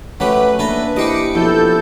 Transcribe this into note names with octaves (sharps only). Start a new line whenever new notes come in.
F#3 A3 C#4 G4 B4
A#3 D4 E4 A4 A#5
E4 G4 B4 C5 D#5 D6 C#7
B1 F3 E4 A4 G6